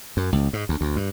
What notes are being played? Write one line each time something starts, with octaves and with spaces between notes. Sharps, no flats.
F#2
C#2
G#2
D2
D2
G2